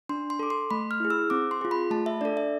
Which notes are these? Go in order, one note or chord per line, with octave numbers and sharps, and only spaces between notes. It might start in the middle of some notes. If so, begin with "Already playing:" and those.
D4 C6
C6
A4 D6
C6
A3 B5
F6
E4 G#4
E6
C4 D6
C6
F4 G#4
B5
A3 A5
E5
D4 A4 D5
E5